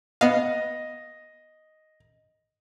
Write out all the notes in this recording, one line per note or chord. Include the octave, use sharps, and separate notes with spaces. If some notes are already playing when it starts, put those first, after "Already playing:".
B3 D#5 F5